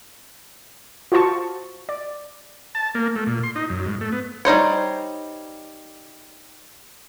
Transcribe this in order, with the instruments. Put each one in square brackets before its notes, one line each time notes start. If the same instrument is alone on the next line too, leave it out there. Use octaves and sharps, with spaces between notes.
[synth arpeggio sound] F4 F#4 C5 A5 C#6
D5
[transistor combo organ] A5
A#3
A3
A#2
C6
D#4
F#2
G#2
A3
B3
[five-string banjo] G3 D#4 C5 C#5